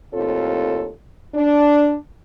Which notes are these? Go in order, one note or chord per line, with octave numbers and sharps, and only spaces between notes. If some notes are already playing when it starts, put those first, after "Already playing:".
D#2 A2 C4 F4 A4 C#5
D4